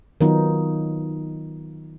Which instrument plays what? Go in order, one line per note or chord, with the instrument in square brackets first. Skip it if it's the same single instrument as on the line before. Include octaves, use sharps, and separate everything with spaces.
[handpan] D#3 F#3 B3 D#4 F4